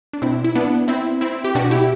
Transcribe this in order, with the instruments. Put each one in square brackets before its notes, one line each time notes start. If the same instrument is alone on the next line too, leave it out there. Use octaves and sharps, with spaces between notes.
[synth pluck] D4
B2 C4 E4
E4
B3 D4
C4 E4
C4 E4
G4
B2 D4 F#4
E4 G4